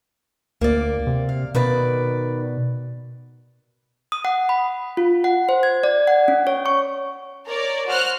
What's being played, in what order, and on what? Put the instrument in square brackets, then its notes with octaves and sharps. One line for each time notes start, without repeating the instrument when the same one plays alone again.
[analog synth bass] D2 [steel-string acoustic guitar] A#3 D5
[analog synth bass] C3
[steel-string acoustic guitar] F5
[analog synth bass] B2 [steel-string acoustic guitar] D#3 B4 D5
[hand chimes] D#6
F#5
B5
F4
F#5
C5
G#6
D5
F#5
C#4
C#5
C#6
[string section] A#4 C#5 D5
F#4 C5 F6 F#6